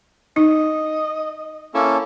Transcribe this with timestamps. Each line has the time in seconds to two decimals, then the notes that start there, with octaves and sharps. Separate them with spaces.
0.36 D#4 D#5
1.74 A#3 C#4 E4 A4